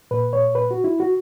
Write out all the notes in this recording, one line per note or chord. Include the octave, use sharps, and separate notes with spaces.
A#2 B4
C#5
B4
F#4
E4
F#4